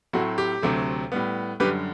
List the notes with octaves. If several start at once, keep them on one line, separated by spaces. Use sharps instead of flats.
A2 F#3 A3 C4 F#4
G4
D2 C3 F#3 A3 C4
A2 G3 B3
F#2 D3 G3 G4 B4